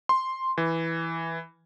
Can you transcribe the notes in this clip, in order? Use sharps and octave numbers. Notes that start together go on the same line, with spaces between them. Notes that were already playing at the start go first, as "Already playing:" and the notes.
C6
E3